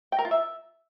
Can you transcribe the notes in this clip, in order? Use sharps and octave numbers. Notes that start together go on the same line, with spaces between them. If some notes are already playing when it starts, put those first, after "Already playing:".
G5
A#4
F4
E5